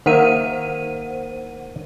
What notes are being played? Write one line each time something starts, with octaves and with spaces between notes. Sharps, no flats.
D#3 A#3 C5 E5 F#5 D#7